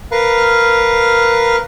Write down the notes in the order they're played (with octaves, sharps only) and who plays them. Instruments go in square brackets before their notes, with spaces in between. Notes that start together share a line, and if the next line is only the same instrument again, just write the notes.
[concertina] A#4 B4 F5